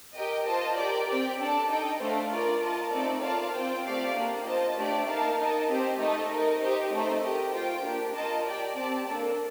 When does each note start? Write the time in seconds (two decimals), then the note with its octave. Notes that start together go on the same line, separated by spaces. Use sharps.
0.15 G4 A#4 D#5 G5
0.46 F4 C5 D#5 A5
0.77 G4 A#4 D5 G5
1.07 C4 G4 D5 G5
1.38 D4 A4 D5 A5
1.69 D#4 A4 D#5 G5
2.00 A3 D4 A4 C5 F5
2.31 F4 A#4 D5
2.61 F4 A#4 D#5 A5
2.91 A3 C4 D#4 A4 D5
3.22 F4 A#4 D5 F5 A5
3.53 C4 F4 C5 G5
3.83 A3 C4 G4 D5 F5
4.15 A#3 D4 G4
4.45 F4 C5 D#5 A5
4.76 A3 D4 G4 D5
5.07 A#3 D#4 A#4 F5 A5
5.38 D#4 A#4 D#5 A5
5.68 C4 G4 C5 D#5
5.98 A3 D#4 A4 D#5
6.30 D#4 A#4 D#5
6.60 D#4 G4 C5 D#5
6.91 A3 C4 D#4 A4 C5
7.22 G4 A#4 D#5
7.52 F4 C5 G5
7.83 A#3 D4 G4
8.14 F4 A#4 D#5 A5
8.45 G4 D5 G5
8.75 C4 G4 D5 A5
9.06 A#3 D4 A4